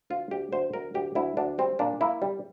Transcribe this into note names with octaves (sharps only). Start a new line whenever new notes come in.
D2 F4
D2 G4
D2 C5
D2 A#4
D2 G4
D2 E4
D2 D4
G3 C4
A#2 D4
A#3 E4
G3